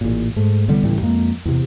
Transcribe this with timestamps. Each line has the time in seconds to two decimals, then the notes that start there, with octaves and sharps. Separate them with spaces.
0.01 A1 A#2
0.36 G#2 A3
0.68 C2 D3 G3 B3
0.83 C#2 A2 E3 G3
1.02 F2 G#3 A#3
1.45 E2 C3